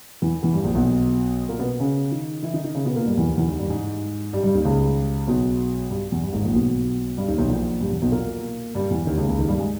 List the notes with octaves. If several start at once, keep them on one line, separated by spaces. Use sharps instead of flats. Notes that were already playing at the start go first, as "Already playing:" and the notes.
E2 E3
E2 E3
G2
A#1 A#2
B1 B2
A#2 A#3
B2 B3
C#3 C#4
D#3 D#4
E3 E4
D#3 D#4
D#3 D#4
C#3 C#4
B2 B3
A#2 A#3
G2 G3
E2 E3
D#2 D#3
E2 E3
D#2 D#3
G2 G3
G#2 G#3
G2 G3
G2 G3
D#2 D#3
C#2 C#3
B1 B2
G2
E2
G2
G#1 G#2
A#1 A#2
B1 B2
G2 G3
D#2 D#3
B1 B2
A#1 A#2
G2
E2
B1 B2
A#2 A#3
G2 G3
E2 E3
D#2 D#3
C#2 C#3
C#2 C#3
D#2 D#3
G2 G3
G#3